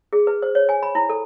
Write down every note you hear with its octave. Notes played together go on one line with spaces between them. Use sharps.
G#4
B4
C5
C#5
G#5
B5
E4
A4